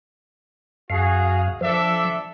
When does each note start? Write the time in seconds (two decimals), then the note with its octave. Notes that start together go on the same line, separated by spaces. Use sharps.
0.90 F#2 F#4 G#4 F5
1.61 F3 D4 A4 E5